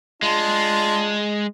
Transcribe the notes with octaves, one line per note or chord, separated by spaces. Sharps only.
G#3 D4 F4